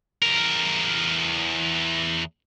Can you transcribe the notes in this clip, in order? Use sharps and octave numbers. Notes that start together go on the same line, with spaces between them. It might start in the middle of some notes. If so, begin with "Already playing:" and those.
E2 A#4